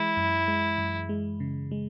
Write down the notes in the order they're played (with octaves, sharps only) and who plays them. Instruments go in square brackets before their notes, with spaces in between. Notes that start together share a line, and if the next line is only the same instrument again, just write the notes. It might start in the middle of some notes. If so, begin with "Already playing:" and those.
Already playing: [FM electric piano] E3 G#3 [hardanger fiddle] E4
[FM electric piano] F#2
G#3
F#2
G#3
C#3
G#3